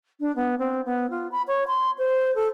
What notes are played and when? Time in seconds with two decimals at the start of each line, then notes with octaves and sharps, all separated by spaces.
0.20 D4
0.36 B3
0.59 C4
0.85 B3
1.10 F4
1.31 B5
1.47 C#5
1.67 C6
1.98 C5
2.35 A4